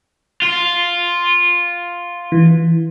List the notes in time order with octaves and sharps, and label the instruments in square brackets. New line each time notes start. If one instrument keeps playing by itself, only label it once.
[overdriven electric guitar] F4
[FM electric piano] E3